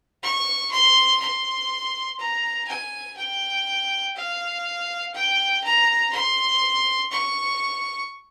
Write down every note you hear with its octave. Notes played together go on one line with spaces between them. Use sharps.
C#6
C6
C6
A#5
G#5
G5
F5
G5
A#5
C6
C#6